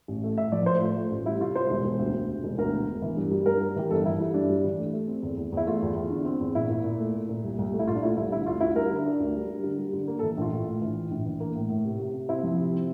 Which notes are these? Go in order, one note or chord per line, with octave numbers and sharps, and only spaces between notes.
A1
A3
A2 E5
F3 D5
A2 C5
A3 F4
A3
A1
G3 E4
C3 F4
G3 C5
E1
E1
D2
D2
C3
E1
D2 A#4
E1
E1
E3
G2
G3
G2 A#4
G3
E3 G4
G1 A4
E3 E4
G3 E4
G2 D4
G3
E3
A3
A3
C4
E2
E2
E2 E4
A3 F4
E2
E2
D3
C4
E2
A#2 E4
A#2
A#2
A3
A3
A#2
C2
C2
A3
E4
A#2 F4
D4
A3 E4
C2 E4
D3 E4
D2 F4
D2 E4
G3 A#4
D3
D4
D2
G3
G3
D3
G3
D3
A#3
A4
E3
A#1 F4
A#1
A2
E3
A2
A#1
E3
A#3
A2
A2
C3
C3
C3
C4 E4
F3
C3
C4